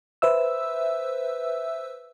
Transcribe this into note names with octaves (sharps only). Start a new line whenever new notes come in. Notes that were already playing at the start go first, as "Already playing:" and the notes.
B4 C5 E5 E6